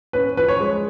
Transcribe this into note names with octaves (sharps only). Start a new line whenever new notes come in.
C#4 B4
F3 B4
C#5
G#3